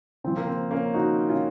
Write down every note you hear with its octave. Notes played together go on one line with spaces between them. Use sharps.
C#3 F3 C4
A#3
C4
A#3 C#4
D#4 F#4
C#4 F4